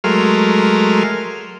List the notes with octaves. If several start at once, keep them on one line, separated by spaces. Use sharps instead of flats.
F#3 G#3 A3 A#4 C6 F6